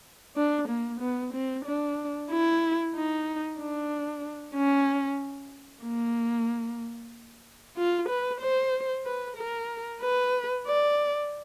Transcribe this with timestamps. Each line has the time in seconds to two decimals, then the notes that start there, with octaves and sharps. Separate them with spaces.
0.36 D4
0.68 A#3
1.00 B3
1.33 C4
1.65 D4
2.30 E4
2.94 D#4
3.59 D4
4.55 C#4
5.83 A#3
7.76 F4
8.09 B4
8.40 C5
9.05 B4
9.37 A#4
10.02 B4
10.67 D5